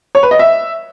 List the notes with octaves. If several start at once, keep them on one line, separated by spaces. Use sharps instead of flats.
C#5
B4
D#5
E5